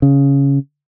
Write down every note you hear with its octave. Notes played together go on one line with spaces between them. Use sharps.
C#3